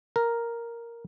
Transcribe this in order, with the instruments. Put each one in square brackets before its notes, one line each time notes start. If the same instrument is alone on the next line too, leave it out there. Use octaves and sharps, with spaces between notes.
[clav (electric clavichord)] A#4